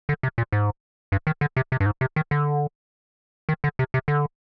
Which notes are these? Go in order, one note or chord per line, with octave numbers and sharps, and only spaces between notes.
D3
C3
A#2
G#2
G2
D#3
D3
C3
C3
G2
G#2
C3
D#3
D3
D#3
D3
C3
C3
D3